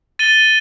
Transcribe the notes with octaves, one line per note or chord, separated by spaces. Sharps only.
A6 D#7 G7